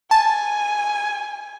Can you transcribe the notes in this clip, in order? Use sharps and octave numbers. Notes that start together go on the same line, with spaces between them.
G#5 A5